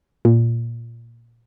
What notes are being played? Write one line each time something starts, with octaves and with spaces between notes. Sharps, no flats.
A#2